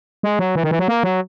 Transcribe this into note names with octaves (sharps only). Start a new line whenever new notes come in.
G#3
F#3
E3
D#3
E3
F#3
A#3
F#3